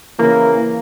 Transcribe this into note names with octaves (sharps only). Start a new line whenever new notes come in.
C#3 E3 A#3